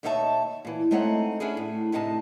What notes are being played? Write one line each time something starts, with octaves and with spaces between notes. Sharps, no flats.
D#2 B2 D#4 C#5 E5 A5
A#2 E3
G#3 A3 C4 D#4 C#5 F#5
C#4 D4 E4 G#4
A2
D2 A2 C3 D#4 G5 A5